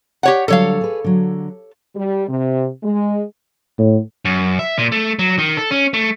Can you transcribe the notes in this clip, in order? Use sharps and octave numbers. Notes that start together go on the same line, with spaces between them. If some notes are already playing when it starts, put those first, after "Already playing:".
G4 C#5 F#5
D3 F#3 G3 A4 C#5 F5
G#4 B4
D3 F#3
G3
C3
G#3
A2
F#2
E5
A#2
A3
F#3
D#3
A4
C#4
A3